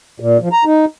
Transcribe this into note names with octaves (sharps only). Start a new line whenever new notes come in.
A#2
F3
A#5
D#4